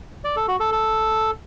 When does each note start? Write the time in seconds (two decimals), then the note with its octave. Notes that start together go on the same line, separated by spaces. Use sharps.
0.24 D5
0.36 A4
0.48 F#4
0.60 A4
0.72 A4